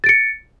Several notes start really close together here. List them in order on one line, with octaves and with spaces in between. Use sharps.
A6 D7 C#7